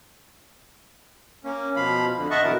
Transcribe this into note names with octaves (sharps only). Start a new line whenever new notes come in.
A#3 C#4
B2 F3 F5 B5
F2 D3
D#5 E5 F#5 A5 C#6
B2 D3 E3 F#3 E4 A#4